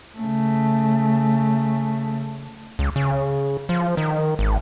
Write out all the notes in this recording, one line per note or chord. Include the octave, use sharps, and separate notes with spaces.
C#3 A3
C#2
C#3
F3
D#3
G#1